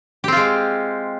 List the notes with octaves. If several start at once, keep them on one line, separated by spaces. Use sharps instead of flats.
G#3 C4 F4 G4